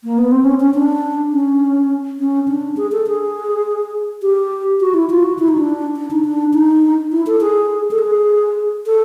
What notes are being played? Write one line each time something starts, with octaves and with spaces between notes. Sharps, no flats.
A#3
B3
C4
C#4
C#4
D4
C#4
C#4
D4
G#4
A4
G#4
G4
F#4
E4
F4
F#4
E4
D#4
D4
D4
D#4
D4
D#4
E4
A4
G#4
A4
G#4
A4